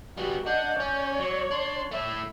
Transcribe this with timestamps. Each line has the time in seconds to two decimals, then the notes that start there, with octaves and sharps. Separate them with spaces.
0.18 G3 B3 F#4 G4
0.46 D4 D#5 F#5 G6
0.80 C#4 C#5 D5
1.20 F#3 C#6
1.51 D4 C6
1.91 A3 E4 E5